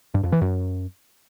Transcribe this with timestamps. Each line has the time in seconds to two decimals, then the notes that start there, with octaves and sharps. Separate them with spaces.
0.14 G2
0.23 F2
0.32 E3
0.41 F#2